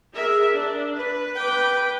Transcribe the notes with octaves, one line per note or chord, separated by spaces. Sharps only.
G#4 A#4 E5
D4
B4
G5 D6